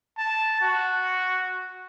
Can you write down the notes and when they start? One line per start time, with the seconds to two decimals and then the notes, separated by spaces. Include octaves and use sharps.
0.18 A5
0.61 F#4